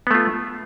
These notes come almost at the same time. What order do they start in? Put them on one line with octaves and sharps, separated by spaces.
B3 A3 F4